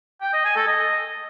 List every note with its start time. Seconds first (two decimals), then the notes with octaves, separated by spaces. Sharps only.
0.22 G5
0.33 D#5
0.45 G#5
0.56 A4
0.68 D#5